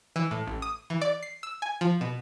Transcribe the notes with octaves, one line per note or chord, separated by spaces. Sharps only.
E3
A2
A1
D#6
E3
D5
C7
E6
G#5
F3
B2